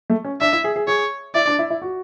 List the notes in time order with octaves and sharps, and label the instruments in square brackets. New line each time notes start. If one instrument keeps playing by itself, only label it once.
[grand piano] A3
C#4
[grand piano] D4 [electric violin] E5
[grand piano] E4
G#4
G#4
[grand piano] G#4 [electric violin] C#5
[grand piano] E4 [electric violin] D5
[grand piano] D4
E4
E4
F#4